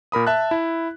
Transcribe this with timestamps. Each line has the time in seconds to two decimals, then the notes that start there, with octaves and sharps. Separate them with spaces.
0.12 A#2 A#4 B5 D#6
0.27 E5 A5 F#6
0.51 E4